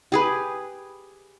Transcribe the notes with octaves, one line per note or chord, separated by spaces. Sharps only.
G4 G#4 B4